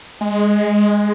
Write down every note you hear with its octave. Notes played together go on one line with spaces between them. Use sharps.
G#3